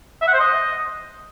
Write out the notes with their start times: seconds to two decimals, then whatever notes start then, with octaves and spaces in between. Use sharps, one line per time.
0.21 E5
0.28 F#5
0.34 C5
0.40 D#5